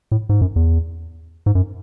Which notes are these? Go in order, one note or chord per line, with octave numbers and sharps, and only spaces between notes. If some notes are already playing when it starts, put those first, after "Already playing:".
A2
G#2
F#2
E2
G#2
F#2